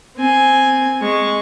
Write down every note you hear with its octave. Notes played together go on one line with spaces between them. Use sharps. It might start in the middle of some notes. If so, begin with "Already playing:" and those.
C4 G#5
G#3 C#6